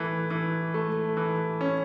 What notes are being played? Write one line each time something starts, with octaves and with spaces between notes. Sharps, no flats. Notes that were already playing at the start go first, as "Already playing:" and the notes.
Already playing: E3 A3
E3
A3
E3
C#4